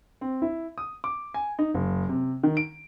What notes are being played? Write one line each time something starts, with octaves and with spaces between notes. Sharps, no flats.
C4
E4
D#6
D6
G#5
D#4
F#1
C3
D#3
D7